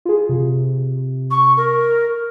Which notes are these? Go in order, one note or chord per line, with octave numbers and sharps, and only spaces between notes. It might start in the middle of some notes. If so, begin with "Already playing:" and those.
F4 G#4
C3
C#6
A#4